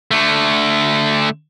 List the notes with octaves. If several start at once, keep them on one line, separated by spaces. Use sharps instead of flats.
D3 A3